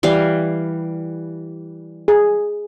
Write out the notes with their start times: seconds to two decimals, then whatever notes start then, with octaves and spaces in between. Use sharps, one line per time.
0.03 E3 G3 F5
2.08 G#4